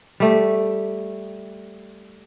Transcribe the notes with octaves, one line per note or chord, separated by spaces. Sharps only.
G3 A3